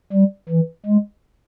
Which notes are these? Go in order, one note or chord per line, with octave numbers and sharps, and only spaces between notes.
G3
E3
G#3